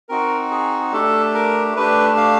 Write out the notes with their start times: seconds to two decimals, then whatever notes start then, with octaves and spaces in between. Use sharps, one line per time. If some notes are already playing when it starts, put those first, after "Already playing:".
0.09 C4 D#4 F#4 A#4
0.51 G#4
0.92 A3 D4 G4 A4
1.34 A#4
1.75 A3 D4 G4 B4
2.17 F5